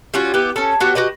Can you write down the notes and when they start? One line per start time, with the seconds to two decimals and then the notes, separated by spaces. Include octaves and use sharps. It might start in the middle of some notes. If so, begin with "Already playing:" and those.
0.14 G3 C#4 F4 F#4
0.34 B3 E4 G4
0.56 C#4 A4
0.80 B3 F#4 G4 C#5
0.95 F#4 G4 B4 D#5